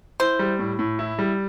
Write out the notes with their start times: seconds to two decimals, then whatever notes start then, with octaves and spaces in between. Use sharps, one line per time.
0.20 E4 C5
0.39 G3
0.59 A2
0.79 A2
0.99 E4
1.19 G3